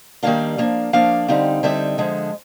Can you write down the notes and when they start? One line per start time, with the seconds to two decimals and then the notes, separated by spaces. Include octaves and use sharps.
0.23 D#3 G3 A#3 D4 F5
0.58 F3 A#3 D4
0.93 F3 A#3 D4 F5
1.28 D3 G3 C4 D#4
1.63 D3 G3 C4 D#4 E5
1.98 D3 F3 G#3